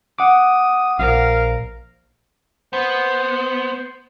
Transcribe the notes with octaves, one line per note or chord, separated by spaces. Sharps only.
F#5 D6 D#6
A#1 A#4 F5
B3 C5